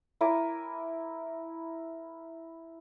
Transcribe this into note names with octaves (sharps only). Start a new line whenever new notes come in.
E4 A#4 G#5 D6